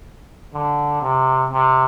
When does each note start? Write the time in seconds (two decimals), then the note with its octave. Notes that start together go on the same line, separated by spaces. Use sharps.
0.54 D3
1.01 C3
1.50 C3